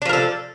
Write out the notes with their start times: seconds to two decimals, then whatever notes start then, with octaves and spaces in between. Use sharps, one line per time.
0.02 D4
0.05 F3
0.09 A#4
0.13 A4